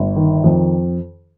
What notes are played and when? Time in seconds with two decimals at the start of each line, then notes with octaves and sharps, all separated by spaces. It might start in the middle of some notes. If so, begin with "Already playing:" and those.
Already playing: G1
0.16 D#3
0.44 F2